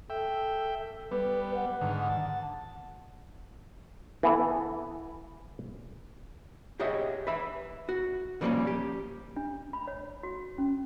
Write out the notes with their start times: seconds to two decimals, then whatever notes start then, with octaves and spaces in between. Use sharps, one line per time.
0.10 A4 E5 G5
1.11 G3 B3 B4
1.55 F#5
1.81 G#2 D3 D#3
2.09 A5
4.23 E3 B3 A4
6.80 G4 G#4 C#5 D#5 E5 F#5
7.27 B4 E5 B5
7.89 F#4
8.41 D3 F3 G3 A3 A#3 C#4
8.67 G4
9.36 D4
9.73 B5
9.87 C#5
10.23 F#4
10.58 C#4